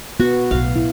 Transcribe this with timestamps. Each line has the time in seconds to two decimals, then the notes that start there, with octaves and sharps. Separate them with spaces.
0.20 B3 F#4
0.51 B1 A2 F5
0.76 E4